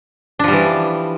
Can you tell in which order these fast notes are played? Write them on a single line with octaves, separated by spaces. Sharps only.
D4 F3 G3 E3